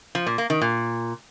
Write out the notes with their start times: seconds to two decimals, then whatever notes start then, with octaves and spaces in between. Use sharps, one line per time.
0.15 F3
0.27 A#2
0.38 A#3
0.50 D#3
0.62 A#2